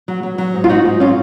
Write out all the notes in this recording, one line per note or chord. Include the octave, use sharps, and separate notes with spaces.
F#3
F#3
F#3
G#2
F4
G#2 D#4 F#4
G#2
F#3 C#4 F4